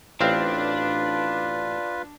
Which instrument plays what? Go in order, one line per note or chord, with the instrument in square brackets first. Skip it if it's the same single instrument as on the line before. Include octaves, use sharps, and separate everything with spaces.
[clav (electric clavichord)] A1 C4 F5 [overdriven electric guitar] D4 [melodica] F4 B4